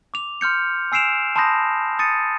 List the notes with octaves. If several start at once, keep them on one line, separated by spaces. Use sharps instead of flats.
D6 F7
C6 F6 G6 C#7
G#5 E6 C7 D7 E7 F7
A5 B5 C6 D#6 G6 A#6
D#6 A6 C#7 D#7